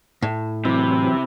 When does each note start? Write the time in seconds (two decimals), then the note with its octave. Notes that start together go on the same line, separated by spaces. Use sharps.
0.22 A2
0.65 C3 E3 F#3 C4 E4 D6